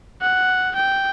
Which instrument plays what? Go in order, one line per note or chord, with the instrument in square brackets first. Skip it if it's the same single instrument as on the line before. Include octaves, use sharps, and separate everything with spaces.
[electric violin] F#5
G5